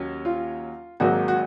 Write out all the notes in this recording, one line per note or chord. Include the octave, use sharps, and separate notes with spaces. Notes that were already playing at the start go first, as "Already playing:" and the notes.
Already playing: D#2 F#3 C#4
F4
G#1 G#2 F#3 A#3 F#4
F#4